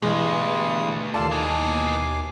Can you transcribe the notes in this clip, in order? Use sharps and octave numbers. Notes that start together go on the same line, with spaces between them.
D2 G2 B2 E3 G3 G#3 D#6
D#2 B2 F4 A4 D5 A5 C7
E3 D#4 G#5 D6